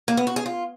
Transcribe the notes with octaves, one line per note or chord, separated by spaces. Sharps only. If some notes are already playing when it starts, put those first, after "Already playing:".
A#3
B3
F#4
G#4
F4